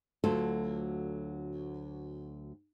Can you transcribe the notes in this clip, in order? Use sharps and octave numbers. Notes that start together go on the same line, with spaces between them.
D2 F#3 F4 A4